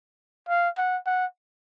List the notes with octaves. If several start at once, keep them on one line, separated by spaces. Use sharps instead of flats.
F5
F#5
F#5